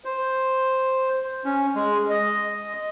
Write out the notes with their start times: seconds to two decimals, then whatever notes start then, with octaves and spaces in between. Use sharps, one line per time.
0.05 C5
1.45 C#4
1.75 G#3
2.10 D#5